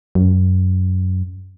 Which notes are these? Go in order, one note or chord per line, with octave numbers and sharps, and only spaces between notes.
F#2